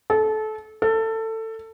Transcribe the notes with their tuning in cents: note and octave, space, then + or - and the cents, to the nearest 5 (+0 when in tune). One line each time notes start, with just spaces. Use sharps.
A4 -25
A4 +20